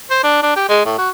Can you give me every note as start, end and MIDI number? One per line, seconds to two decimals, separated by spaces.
0.10 0.19 72
0.23 0.42 62
0.43 0.55 62
0.56 0.68 67
0.69 0.82 56
0.85 0.97 45
0.98 1.10 66